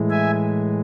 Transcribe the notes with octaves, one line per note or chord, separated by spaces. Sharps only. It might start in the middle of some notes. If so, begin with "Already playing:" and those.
Already playing: A2 E3 G#3
E5 G#5